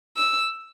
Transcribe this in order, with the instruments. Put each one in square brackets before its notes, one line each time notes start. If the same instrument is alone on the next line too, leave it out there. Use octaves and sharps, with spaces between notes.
[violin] E6